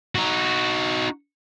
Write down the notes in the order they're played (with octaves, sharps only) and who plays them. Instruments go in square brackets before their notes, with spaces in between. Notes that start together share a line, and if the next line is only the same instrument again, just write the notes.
[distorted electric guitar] D#4 F#4